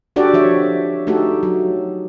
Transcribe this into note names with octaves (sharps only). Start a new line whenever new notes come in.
D4 F#4 G4 A4 D5
F3 C#5 E5
A3 D#4 F#4 G4 A4
F#3